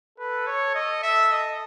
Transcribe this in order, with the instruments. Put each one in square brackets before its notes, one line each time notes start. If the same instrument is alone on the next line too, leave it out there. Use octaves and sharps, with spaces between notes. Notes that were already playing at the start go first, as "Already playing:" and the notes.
[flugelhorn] A4 [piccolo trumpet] B4
[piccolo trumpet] C#5
D#5
E5
D#5